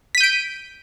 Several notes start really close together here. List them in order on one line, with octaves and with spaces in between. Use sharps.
B6 D#7 G6 D7